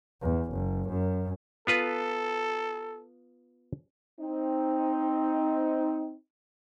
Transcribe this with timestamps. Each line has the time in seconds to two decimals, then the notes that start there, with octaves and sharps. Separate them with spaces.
0.21 E2
0.52 F#1
0.89 F#2
1.67 B3 F4 A4 B4
4.20 C4 D#4